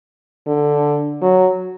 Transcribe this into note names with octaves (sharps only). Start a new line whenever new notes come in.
D3
F#3